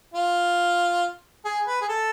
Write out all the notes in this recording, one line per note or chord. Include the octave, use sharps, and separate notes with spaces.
F4
G#4
B4
G#4
A4